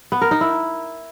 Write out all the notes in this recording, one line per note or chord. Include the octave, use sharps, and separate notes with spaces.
B3
A#4
D#4
E4